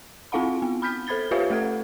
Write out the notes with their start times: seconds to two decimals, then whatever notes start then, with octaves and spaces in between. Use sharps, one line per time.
0.32 C4 E4 F4 F5 F#5 B5
0.62 B3
0.82 B5 F6 G6 B6
1.07 A4 C5 B5 G#6 A6 G7
1.31 F4 G4 B4 C#5 E5 F5
1.50 A3 A4 F#5 G#6